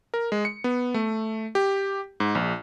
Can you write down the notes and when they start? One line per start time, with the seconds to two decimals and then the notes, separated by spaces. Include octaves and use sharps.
0.14 A#4
0.32 G#3
0.45 C#7
0.64 B3
0.94 A3
1.55 G4
2.20 G#2
2.35 A#1